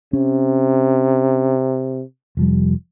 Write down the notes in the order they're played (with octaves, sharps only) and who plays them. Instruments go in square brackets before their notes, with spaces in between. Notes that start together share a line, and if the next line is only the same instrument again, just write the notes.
[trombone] C3 [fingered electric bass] C#4
[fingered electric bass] F1 F3 G3